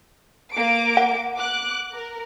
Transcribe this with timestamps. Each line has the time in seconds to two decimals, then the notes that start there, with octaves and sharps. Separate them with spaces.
0.52 A#3 D6 D7
0.97 F#5
1.36 D6 F#6
1.94 A#4